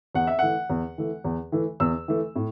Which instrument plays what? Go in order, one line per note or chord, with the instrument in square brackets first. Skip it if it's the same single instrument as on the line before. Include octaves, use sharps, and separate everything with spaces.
[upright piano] E2 F#5
E5
E3 A3 F#5
E2
E3 A3
E2
E3 A3
E2 E6
E3 A3
A2